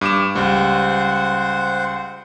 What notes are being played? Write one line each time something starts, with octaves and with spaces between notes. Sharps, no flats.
G2 D6 E7
C#2 G3 C5 F#5